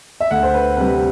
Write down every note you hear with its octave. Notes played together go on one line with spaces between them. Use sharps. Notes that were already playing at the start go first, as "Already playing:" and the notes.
E5
D2 F#5
C5
B4
C3 G3 B4